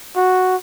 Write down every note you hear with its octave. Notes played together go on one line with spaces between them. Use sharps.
F#4